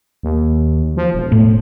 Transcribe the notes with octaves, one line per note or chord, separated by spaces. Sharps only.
D#2
F3
E1
A2